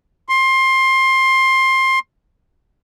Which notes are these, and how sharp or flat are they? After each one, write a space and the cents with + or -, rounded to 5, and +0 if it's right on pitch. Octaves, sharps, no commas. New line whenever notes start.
C6 +20